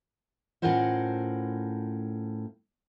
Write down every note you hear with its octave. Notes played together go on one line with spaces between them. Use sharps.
A2 C#4 F4 A#4 C5 F#5